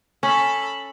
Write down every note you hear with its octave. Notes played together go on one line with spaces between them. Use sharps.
C#4 A4 B5